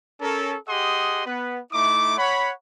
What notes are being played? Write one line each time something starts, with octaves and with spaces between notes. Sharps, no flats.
C#4 A4 A#4
G4 G#4 D#5 F#5 C6 D#6
B3 B4
A3 D#4 E4 D6
C#5 F#5 B5